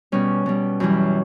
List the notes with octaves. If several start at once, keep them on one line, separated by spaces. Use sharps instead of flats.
B2 G3 C#4
B2 G3
F#2 E3 G3